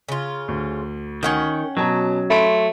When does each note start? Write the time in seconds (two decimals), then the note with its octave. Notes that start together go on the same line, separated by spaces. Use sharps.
0.09 C#3 F4
0.48 D2
1.23 D#3 C#4 F#5 G5
1.77 B2 F#3 A5 A#5
2.30 A3 B5 C6 D7